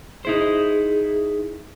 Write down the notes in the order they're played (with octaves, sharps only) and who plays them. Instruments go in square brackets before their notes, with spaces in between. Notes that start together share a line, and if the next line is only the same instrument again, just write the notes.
[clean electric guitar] D#4 E4 C5 [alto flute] G#4